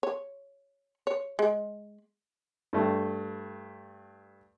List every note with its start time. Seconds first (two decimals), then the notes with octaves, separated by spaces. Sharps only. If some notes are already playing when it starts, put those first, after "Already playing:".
0.03 C#5
1.07 C#5
1.39 G#3
2.73 G2 A3